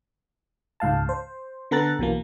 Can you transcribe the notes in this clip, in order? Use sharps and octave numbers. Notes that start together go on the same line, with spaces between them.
C#2 G#2 F5 A5
C5
D3 B3 A4 A#5 F#6 A6
B1 B2 E3 A#3